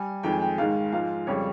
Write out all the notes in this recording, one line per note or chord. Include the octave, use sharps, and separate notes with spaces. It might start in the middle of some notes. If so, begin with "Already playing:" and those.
Already playing: G3 G#5
F2 D#3 G#3 G5
G#5
G5
G#2 D#3 G#3 F5
G#2 F3 G#3 F5
F2 C#3 G3 C#5